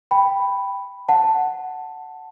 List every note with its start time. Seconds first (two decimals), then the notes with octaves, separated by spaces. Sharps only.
0.11 G5 B5
1.09 F#5 A5